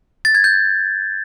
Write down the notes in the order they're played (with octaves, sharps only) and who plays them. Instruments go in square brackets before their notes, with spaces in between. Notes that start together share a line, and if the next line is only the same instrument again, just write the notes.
[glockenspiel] A6
G#6
G6